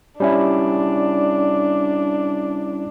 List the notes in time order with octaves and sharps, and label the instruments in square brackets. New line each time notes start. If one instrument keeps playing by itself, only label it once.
[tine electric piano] G3 C#4 E4 [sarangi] D4